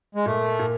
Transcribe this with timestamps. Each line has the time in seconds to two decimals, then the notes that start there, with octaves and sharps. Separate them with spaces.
0.15 G#3
0.26 A#2 A3
0.59 A#2